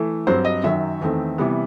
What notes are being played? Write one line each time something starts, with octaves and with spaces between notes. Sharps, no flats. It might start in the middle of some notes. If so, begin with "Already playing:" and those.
Already playing: E3 A3
G2 F#3 C4 C5
D#5
F#2 D#3 F#3 E5
E2 D#3 A3 C4
C3 E3 G3 B3